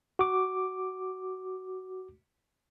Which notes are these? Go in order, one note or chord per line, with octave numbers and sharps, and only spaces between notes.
F#4 D6